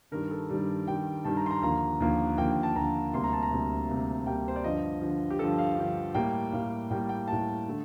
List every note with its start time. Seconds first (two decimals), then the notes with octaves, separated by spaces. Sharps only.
0.11 G2 D#3 G3 A#4
0.31 A4
0.49 G2 D#3 G3
0.87 G2 D#3 G3 G5
1.25 G2 D#3 G3 A5
1.37 A#5
1.46 C6
1.51 A#5
1.63 D#2 D3 F3 A#3 A#5
2.00 D#2 D3 F3 A#3
2.37 D#2 D3 F3 A#3 G5
2.50 G5
2.63 A5
2.76 D#2 D3 F3 A#3 A#5
3.13 D2 C3 G3 A#3 C6
3.24 A#5
3.33 A5
3.43 A#5
3.51 D2 C3 G3 A#3
3.88 D2 C3 G3 A#3
4.26 D2 C3 G3 A#3 G5
4.48 C5
4.56 D5
4.64 G2 D3 F3 D#5
5.01 G2 D3 F3
5.30 G4
5.39 G2 D3 F3 A4
5.58 F5
5.77 G2 D3 F3
6.14 A2 G3 A#3 G5
6.52 A2 G3 A#3 F5
6.90 A2 G3 A#3 G5
7.09 G5
7.27 A2 G3 A#3 A5
7.68 D3 A3